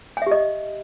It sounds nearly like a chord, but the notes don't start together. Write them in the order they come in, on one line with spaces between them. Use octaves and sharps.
G#5 E5 G4 D#5